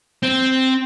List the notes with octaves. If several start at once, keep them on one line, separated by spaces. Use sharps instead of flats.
C4